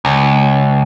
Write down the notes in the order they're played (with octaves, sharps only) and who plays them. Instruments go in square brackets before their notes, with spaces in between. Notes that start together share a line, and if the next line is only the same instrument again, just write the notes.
[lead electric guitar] C#2